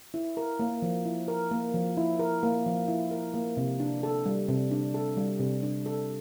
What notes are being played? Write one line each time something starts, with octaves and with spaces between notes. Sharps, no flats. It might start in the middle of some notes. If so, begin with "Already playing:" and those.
E4
A#4
A#3
F3
E4
A#4
A#3
F3
E4
A#4
A#3
F3
E4
A#4
A#3
C3
D4
A4
G3
C3
D4
A4
G3
C3
D4
A4